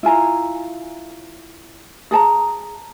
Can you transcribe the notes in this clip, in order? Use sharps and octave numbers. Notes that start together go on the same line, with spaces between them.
E4 F4 G#5 A#5
G#4 A4 A5 A#5